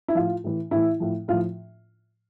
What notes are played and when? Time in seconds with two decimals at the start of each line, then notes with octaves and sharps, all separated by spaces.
0.08 E4
0.15 A2 F3 F4
0.44 A2 E3
0.71 A2 E3 E4
1.00 A2 F3
1.28 A2 F4
1.33 F3